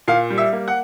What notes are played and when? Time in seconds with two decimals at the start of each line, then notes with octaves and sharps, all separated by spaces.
0.08 A#2 F5
0.30 G3
0.38 E5
0.53 A#3
0.68 F#5